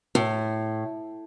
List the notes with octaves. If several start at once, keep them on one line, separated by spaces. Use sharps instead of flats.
A2